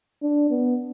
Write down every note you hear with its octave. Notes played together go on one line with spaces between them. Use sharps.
D4
B3